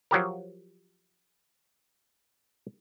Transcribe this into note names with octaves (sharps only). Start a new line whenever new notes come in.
F3 F#3 G4 A#4